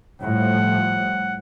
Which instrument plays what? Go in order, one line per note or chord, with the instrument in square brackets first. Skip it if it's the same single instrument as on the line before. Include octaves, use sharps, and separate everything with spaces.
[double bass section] A2 F3 G3 [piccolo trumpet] F#5